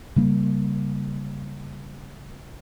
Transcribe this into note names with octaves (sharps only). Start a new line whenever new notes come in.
C#3 G3 A#3